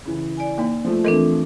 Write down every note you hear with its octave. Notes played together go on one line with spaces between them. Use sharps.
C#3 E3
D5 G#5
A#3 D#4
F3 A3
E3 C4 D4 A4 A#4 D#5